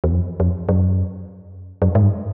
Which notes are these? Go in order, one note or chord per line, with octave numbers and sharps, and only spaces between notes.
E2
F2
F2
F#2
F#2
G#2
G2